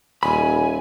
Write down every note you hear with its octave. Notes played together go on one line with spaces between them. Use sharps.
D#1 G#5 B5